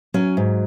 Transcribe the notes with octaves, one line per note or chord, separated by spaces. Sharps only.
F#3 C#4
G#2